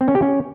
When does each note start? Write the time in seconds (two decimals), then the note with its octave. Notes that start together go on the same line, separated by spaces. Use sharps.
0.01 C4
0.08 C#4
0.15 G4
0.22 C#4